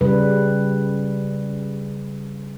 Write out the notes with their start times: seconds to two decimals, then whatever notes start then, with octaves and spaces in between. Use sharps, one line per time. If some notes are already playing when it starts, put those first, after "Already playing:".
0.01 C#3 G3 B4